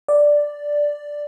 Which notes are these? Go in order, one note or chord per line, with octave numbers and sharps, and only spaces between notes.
D5